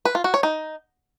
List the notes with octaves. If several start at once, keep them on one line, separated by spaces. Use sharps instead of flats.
B4
F4
F#4
C#5
D#4